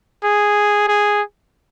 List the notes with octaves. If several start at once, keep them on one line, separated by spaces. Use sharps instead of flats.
G#4
G#4